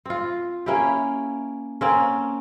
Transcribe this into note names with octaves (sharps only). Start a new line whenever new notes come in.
C4 F4
A#3 C#4 E4 G4
A#3 C4 C#4